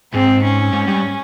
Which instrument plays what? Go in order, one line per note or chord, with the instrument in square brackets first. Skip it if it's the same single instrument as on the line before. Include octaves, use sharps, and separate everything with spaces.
[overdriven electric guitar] G#2 [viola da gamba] C4
[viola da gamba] C#4
[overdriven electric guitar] G#2
G2